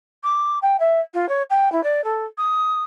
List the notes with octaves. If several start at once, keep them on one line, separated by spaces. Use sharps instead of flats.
D6
G5
E5
F4
C#5
G5
E4
D5
A4
D#6